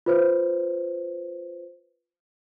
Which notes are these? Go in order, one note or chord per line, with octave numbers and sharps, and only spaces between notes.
F4 B4 C5